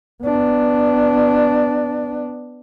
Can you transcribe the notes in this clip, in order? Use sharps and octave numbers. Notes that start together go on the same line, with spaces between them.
B3 D4